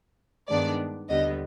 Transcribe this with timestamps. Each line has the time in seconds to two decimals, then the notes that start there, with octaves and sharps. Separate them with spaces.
0.49 G2 D#3 G#3 B3 D4 D5
1.09 D#2 D3 G3 B3 D#5